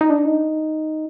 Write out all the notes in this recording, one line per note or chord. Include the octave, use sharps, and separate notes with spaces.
D#4
D4
D#4